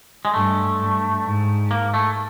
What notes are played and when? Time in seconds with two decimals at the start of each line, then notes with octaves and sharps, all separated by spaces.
0.25 G#3
0.33 G2 A3
0.79 G2
1.24 G#2
1.71 A#3
1.94 A3